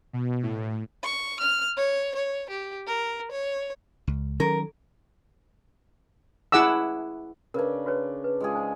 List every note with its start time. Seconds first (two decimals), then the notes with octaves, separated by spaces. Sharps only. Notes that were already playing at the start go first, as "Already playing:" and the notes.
0.13 B2
0.43 A2
1.04 C#6
1.40 F6
1.77 C#5
2.16 C#5
2.50 G4
2.87 A#4
3.32 C#5
4.07 C#2
4.40 D#3 F#3 C#4 A#4
6.52 E4 G#4 F#5 D6 E6
7.54 C#3 D4 A#4 B4 D5
7.86 F#4 B4 C#5
8.24 B4
8.40 G#3 F4 G#4
8.54 D#4 C5 G#5